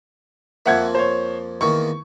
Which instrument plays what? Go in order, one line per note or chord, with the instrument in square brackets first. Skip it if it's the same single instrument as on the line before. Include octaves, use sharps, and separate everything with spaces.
[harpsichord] F2 F3 A#3 [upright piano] E5 F#5 G#6
[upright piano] C5 C#5
[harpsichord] E2 D#3 A#3 [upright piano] C#6